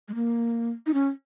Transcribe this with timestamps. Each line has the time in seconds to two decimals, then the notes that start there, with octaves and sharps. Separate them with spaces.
0.08 G#3
0.15 A#3
0.86 D#4
0.94 C#4